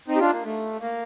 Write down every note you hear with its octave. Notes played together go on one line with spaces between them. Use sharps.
C4 D#4
G4
D4 F4
A#3
A3
A#3